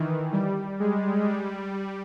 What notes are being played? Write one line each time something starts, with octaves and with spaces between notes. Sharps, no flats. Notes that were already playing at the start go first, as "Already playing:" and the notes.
Already playing: D#3 E3
G3
G#3
G3